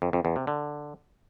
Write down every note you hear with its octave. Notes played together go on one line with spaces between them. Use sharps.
F2
F2
E2
C3
D3